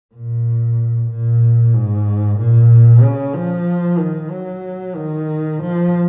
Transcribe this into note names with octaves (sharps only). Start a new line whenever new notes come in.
A#2
A#2
G#2
A#2
C#3
F3
D#3
F#3
D#3
F3